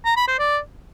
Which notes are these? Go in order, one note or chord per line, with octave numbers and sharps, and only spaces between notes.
A#5
B5
C5
D5